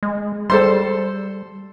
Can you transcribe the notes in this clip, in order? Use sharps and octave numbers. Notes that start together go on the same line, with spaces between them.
G#3
G3 A4 C5 C6